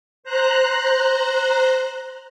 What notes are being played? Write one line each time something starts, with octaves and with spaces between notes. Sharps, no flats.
C5 A#5 F#6